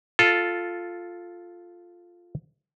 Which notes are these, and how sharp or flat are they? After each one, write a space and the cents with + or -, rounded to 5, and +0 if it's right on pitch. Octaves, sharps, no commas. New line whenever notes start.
F4 +0 A4 +0